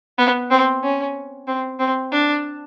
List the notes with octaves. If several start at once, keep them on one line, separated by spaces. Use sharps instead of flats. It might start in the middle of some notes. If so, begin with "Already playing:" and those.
B3
C4
C#4
C4
C4
D4